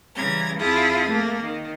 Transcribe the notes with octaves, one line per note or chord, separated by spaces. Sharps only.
C#3 E3 G3 A#5 G#6
F2 E4 F4 G#4 A5 D#6
A3 A#3
D#3